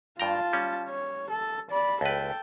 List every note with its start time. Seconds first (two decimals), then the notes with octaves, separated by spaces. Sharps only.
0.20 G2 F4 G5 A5 A#5
0.53 G3 C#4
0.89 C#5
1.30 A4
1.71 D5 B5
2.01 C#2 A4 B4 G5